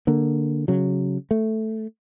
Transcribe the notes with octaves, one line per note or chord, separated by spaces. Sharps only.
D3 A#3
C#3 F#3
A3